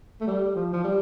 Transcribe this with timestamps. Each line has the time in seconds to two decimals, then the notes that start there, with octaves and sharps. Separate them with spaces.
0.21 A3
0.27 G3
0.55 F3
0.73 F3
0.84 G3